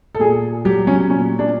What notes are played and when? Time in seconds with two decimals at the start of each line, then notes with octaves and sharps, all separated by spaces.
0.15 A4
0.20 A#2 G#4
0.65 F#3 G4
0.87 C#4
1.09 A#2 C#4
1.39 D4